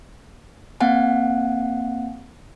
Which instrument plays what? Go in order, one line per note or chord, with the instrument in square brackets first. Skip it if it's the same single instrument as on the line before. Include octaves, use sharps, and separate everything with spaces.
[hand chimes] A#3 C4 F5 F#5 G#5